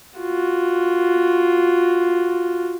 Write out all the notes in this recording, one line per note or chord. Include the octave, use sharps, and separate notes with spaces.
F4 F#4